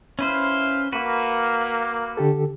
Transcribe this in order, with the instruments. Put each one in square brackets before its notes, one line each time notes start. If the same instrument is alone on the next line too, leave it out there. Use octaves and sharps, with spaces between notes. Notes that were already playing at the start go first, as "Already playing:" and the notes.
[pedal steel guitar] C#4 B4 C5 [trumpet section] E4 F5
[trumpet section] A#3 [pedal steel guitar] F#4 B4
[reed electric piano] D3 G4 A4